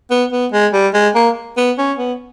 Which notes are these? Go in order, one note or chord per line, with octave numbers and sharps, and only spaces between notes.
B3
B3
G#3
G3
G#3
A#3
B3
C#4
B3